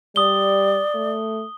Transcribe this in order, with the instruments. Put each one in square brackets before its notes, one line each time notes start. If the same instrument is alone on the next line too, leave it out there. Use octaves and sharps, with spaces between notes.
[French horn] G3 [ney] D5 [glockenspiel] D#6 G7
[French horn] A3